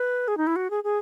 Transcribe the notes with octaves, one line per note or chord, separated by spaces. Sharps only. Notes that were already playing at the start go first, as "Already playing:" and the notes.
Already playing: B4
G#4
D#4
E4
F#4
G#4
G#4